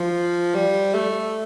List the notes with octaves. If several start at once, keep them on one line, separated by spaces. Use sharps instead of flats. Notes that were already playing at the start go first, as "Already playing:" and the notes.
Already playing: F3
G3
A3